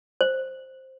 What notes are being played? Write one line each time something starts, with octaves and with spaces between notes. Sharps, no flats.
C5